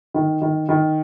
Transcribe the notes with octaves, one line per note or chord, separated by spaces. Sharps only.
D#3
D#3
D#3